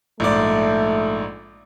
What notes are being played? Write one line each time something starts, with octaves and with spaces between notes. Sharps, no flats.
A#1 G#2 A3 D5